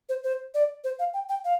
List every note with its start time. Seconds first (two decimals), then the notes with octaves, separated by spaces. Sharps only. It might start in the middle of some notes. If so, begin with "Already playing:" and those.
0.09 C5
0.24 C5
0.54 D5
0.84 C5
0.99 F5
1.14 G5
1.29 G5
1.45 F5